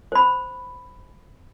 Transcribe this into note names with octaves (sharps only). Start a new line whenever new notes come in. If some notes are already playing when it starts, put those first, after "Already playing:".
C5 B5